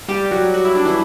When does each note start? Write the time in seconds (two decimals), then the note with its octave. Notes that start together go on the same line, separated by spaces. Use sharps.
0.08 G3 G4
0.31 F#3 F#4
0.54 F#4
0.65 E4
0.75 D4
0.85 E3 E4